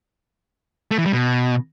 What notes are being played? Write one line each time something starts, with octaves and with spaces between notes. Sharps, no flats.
A3
E3
G3
B2